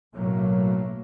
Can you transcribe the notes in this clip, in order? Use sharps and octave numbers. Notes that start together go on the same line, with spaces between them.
B1 A2 F#3 A3 A#3